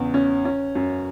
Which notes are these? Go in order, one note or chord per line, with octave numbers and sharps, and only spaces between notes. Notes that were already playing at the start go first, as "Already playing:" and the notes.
Already playing: E2 C#3
C#4
C#4
F#2